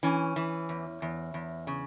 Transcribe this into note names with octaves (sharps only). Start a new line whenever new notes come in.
E3 C#4
E3
E2
E2
E2
C#3